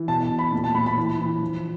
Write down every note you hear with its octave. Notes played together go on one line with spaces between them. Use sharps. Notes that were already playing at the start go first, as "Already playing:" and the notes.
Already playing: E3
B2 A5
B2
B5
A#2
A5
A#2 B5
B5
E3
E3
F3